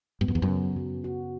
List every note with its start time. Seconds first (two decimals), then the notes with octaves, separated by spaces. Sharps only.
0.21 G2 B3
0.28 F#2
0.35 E2
0.42 F#2
0.49 C#3
0.76 F#3
1.04 F#4